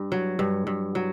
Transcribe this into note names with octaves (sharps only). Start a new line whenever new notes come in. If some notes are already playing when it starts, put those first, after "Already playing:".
Already playing: G2
F#3
G2
G2
F#3